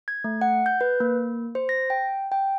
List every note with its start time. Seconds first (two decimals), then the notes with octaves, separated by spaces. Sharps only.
0.08 G#6
0.24 A3
0.42 F#5
0.66 G6
0.81 B4
1.00 A#3
1.55 C5
1.69 A#6
1.90 G5
2.32 G5